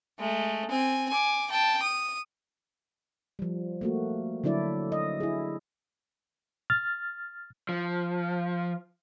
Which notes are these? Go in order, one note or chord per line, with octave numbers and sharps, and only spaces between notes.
G#3 A3
C4 G#5
G#5 D6
G5 A5
D#6
F3 G3
A3 A#3 F#4
D3 F#3 D4 E4 D5
D#5
E4 G#4
F6 A6
F3